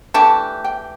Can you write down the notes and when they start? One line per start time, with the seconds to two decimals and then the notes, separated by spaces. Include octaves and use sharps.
0.14 E3 A3 D4 G4 A5
0.64 G5